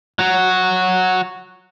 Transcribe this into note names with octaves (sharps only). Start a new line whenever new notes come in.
F#3 F#4